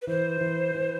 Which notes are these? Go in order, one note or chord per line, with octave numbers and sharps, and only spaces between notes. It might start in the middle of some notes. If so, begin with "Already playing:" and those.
B4
E3 C5
E3
E3